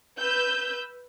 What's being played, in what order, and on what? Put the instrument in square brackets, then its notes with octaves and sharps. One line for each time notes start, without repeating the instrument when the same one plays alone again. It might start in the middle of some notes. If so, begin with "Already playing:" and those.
[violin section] B4 E6 G6